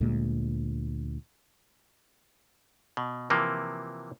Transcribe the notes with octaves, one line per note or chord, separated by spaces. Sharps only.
D2 A#2 G#3 A#3
B2
C3 E3 F3 A#3